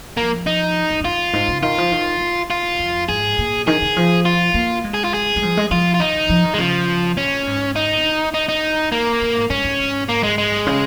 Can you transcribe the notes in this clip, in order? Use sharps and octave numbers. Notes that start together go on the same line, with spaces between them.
F3 A#3
D#4
G#2
G#2
F2 F4
G#2
C#3
D#3 F4
F3
D#3
D#3
F4
F2
G#2 G#4
A#2
D#3 G#4
D#3
F3
F4
A#3
G#3
G#4
F4
G#4
G#3
F3
G#3
F3 F4
F4
D#3 D#4
F3
D#3
G#3
C#3 F3
A#2 C#4
G#2
D#4
D#3
D#4
D#4
A#3
A#2
G#2
G#2 C#4
G#2
G#2
A#3
G#3
G#3
C#3